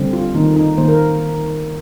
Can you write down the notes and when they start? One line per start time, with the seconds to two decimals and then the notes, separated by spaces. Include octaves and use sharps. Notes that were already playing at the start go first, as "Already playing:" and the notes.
Already playing: D3 G3 C4
0.13 F4
0.35 D#3 A#3 D#4
0.56 D#4
0.78 D#3 A#3 C5
0.88 A#4